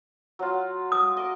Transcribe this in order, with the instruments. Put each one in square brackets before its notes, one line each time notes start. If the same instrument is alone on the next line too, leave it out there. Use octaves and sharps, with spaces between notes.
[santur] F#3 F4
[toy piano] D#6
[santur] D5 D#5